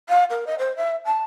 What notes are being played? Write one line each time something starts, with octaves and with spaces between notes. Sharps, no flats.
F5
A#4
D#5
C5
E5
A5